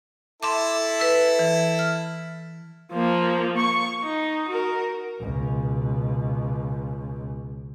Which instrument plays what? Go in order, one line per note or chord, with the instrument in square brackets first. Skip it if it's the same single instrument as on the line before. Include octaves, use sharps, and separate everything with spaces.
[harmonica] E4 A4 [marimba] E5 C6 D6
[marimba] B4 E6
E3
F6
[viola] F3 A#3
C#6
D#4
F#4 A#4
[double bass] C#2 B2